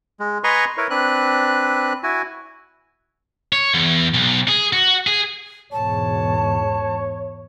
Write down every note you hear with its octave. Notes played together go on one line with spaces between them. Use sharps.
G#3
B4 D#5 G#5 A#5 C6 C#6
E4 A#4 B4 C#5
C4 D4 B4 F#6
E4 F#4 G#5
C#5
E2
B1
G#4
F#4
G#4
E2 G#2 B2 C#5 A5